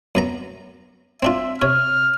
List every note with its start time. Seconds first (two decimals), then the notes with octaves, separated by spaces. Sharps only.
0.15 F#2 B3 A#5
1.23 C4 D4 F4 E5
1.62 C3 C#5 F6